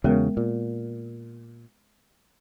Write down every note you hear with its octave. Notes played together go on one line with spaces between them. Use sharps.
E2 C#3 F#3 G#3 B3 A#4
A#2